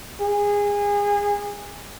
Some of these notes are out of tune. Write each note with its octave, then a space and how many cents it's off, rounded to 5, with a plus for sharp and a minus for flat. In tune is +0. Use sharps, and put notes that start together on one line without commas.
G#4 -25